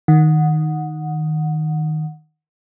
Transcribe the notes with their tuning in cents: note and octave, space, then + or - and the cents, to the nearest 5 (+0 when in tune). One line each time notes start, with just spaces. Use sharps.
D#3 +0 F#5 -15